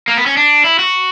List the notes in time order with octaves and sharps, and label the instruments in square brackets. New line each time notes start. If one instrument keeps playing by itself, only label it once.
[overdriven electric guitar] A#3
B3
C#4
D4
E4
F#4